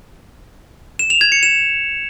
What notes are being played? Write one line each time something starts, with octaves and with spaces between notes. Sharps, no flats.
E7
F7
G#6
C#7
E7